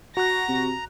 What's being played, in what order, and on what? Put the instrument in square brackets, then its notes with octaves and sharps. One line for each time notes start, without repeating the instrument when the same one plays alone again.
[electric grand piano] F#4 F#6 [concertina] A#5 [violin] A#6
[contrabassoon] C3